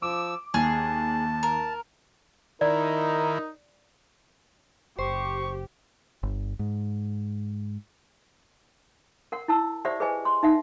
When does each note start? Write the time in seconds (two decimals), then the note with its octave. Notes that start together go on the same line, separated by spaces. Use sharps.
0.02 F3 D6 E6
0.54 D#2 G#4 A5
1.43 A#4
2.61 D#3 D#4 E4 A#4 D5
4.99 F#1 G4 C5 C#6
6.23 G1
6.59 G#2
9.32 A#4 F#5
9.48 E4 A5 E6
9.85 G4 C5 D5 E5 F#5
10.00 G#4 B4 C5 D#5 G#5
10.25 C6
10.43 D#4 E5 F#5